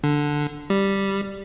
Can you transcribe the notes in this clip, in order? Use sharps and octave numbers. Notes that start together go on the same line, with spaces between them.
D3
G3